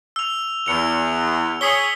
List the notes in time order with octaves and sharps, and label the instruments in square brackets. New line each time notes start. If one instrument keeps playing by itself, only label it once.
[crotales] E6 F7
[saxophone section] E2 [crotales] C#7 F7
[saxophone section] G#4 C#5 [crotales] D#6 B6 G7